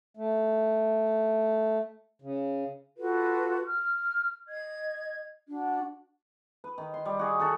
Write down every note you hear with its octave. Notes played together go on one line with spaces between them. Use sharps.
A3
C#3
F4 F#4 A4 B4
F6
D#5 G#6
D4 F#4
B4
D#3
C6
G3
F#4 G#4
D#3 F#4 A4